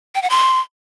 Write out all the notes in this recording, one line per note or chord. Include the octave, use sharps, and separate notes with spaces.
G5
F#5
C6